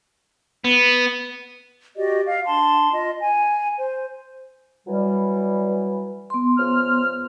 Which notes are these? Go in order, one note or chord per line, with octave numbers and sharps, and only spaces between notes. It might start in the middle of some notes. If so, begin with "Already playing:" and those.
B3
F#4 G4 D5 D#5
F5
D4 A5 C6
F4 D#5
G#5
C5
E3 F#3 G3
B3 C6
C#2 F3 F6